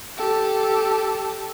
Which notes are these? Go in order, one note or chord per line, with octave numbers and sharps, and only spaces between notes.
G4 A4